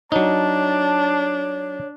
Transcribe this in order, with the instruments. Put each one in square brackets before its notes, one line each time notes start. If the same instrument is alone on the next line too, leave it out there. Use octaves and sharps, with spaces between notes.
[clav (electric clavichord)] F#3 D#4 [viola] D4 [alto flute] C#5 [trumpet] A5